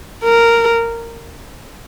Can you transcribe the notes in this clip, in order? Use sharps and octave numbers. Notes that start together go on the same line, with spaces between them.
A#4